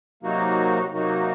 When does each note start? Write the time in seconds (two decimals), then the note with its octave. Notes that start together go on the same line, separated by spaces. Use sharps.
0.23 C3 F#3 A#3 D#4 F#4
0.93 C3 F#3 A#3 D#4 F#4